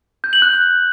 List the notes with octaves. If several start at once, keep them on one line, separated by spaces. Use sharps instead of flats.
G6
F#7
F#6